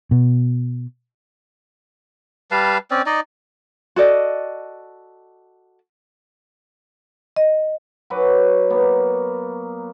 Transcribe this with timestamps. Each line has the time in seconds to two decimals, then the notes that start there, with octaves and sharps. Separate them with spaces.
0.11 B2
2.51 G3 B4 F5 A5
2.91 C4 C#4 D5
3.06 D#4 D5 D#5
3.96 F#4 A4 D5 D#5
7.36 D#5
8.10 F#3 F#4 B4 D6
8.70 A#3 B3